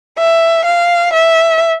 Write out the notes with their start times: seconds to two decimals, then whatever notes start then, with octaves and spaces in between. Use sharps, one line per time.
0.18 E5
0.65 F5
1.13 E5